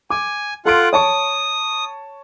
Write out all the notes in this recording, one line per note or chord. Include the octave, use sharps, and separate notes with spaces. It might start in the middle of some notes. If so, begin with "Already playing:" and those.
G#5 D6
F4 A4 F#5 C6 D7
C#5 A5 C#6 D#6